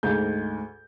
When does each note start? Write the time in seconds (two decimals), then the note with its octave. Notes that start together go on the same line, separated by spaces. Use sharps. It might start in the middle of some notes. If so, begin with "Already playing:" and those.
0.03 D2 G#2 G6